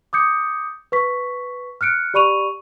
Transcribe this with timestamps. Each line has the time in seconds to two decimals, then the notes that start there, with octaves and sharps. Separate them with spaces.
0.13 D6 D#6 G6 C#7
0.92 B4 C#6 B6
1.81 F6 F#6 C#7 D7
2.14 G4 D5 B5 C#6 D#7 F7